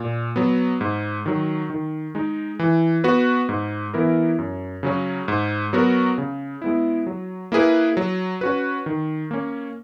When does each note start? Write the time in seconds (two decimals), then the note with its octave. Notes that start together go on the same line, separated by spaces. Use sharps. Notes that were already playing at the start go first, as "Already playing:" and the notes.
Already playing: A#2
0.36 F#3 B3
0.81 G#2
1.26 D#3 F#3
1.70 D#3
2.15 G#3 D#4
2.59 E3
3.04 B3 F#4 B4
3.49 G#2
3.94 E3 B3 E4 A#4
4.38 F#2
4.83 C#3 F#3 C#4
5.28 G#2
5.73 F#3 B3 F#4 A#4
6.18 C#3
6.62 G#3 B3 E4
7.07 F#3
7.52 A#3 E4 G#4 B4
7.97 F#3
8.41 C#4 F#4 B4
8.86 D#3
9.31 A#3 C#4